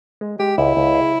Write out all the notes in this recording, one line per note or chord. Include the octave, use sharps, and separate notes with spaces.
G#3
G#3 G4
C#2 E4
C#2
G#4